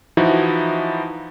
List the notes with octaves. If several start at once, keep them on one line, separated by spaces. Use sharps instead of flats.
E3 F3 D#4 E4 F#4